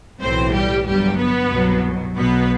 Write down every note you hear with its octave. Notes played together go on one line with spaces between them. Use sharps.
B1 A2 E3 C4 C5
G3 G4
G1 G2 F#3 G3 G4
B3 B4
C2 B2 F#3
B1 B2 F#3 B3 B4